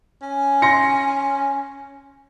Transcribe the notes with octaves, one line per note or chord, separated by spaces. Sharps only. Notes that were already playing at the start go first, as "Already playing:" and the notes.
C#4
C6 A#6 C#7